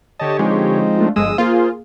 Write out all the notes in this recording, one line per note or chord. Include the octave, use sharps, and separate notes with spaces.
D3 G4 C#5 D#5 A5
F3 G#3 C4 D#4
A3 D4 F4
G1 D3 F3 G#3 D#6 E6
A#3 F4 G#4 C5